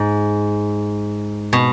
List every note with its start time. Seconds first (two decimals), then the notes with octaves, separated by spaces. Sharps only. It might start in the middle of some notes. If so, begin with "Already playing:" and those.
Already playing: G#2
1.53 B2